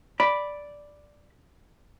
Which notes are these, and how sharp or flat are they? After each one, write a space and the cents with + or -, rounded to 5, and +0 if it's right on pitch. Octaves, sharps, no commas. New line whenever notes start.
D5 +0 B5 +0